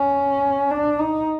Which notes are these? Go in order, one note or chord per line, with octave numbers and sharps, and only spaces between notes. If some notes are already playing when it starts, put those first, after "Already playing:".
Already playing: C#4
D4
D#4